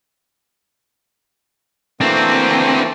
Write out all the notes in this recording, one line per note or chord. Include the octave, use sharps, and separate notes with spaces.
E3 A3 A#3 C4 D4 F#4